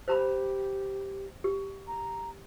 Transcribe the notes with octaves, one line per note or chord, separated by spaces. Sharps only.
G4 C5 A#5 B5
G4
A#5